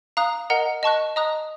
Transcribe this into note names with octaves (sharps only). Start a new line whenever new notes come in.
F5 A#5 D#6 F#6
A#4 D#5 F#5 A#5
D#5 A5 C#6 F#6
D#5 A#5 D#6 F#6